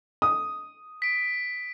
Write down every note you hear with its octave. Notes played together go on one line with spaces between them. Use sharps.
D#6
B6 D7